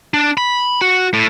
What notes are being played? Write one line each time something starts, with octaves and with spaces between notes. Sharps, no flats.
D4
B5
F#4
A2